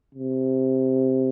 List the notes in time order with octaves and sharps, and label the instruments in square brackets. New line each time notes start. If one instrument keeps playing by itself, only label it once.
[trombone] C3